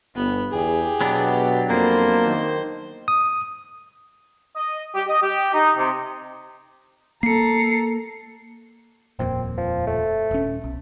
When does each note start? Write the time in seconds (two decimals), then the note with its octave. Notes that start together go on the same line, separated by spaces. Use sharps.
0.15 G1 B3
0.52 E2 G4 G#4
1.01 B2 F#3 B3 D4
1.70 F2 A#3 C5
2.26 D#3
3.08 D#6
4.56 D#5
4.95 G4
5.08 D#5
5.22 G4
5.54 D#4
5.77 C3
7.23 A#3 A4 A#5 C7 C#7
9.19 D#1 F2 A#2 C4
9.58 F3
9.87 A3
10.31 D#1 C#4
10.64 B1